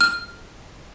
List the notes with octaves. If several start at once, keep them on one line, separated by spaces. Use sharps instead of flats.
F6